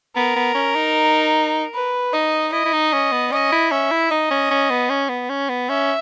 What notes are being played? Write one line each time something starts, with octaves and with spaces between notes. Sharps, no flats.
B3 A#4
B3
C#4
D#4
B4
D#4 D#5
E4 D#5
E4
D#4
C#4
B3
C#4 D#5
E4
C#4 E5
E4
D#4 D#5
C#4
C#4
B3
C#4
B3
C#4
B3
C#4 E5